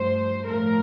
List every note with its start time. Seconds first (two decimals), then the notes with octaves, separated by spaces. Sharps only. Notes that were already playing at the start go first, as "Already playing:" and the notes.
Already playing: G2 F3 A3 C5
0.46 A2 F3 A3 A#4